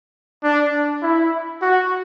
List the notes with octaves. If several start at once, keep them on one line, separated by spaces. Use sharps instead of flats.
D4
E4
F#4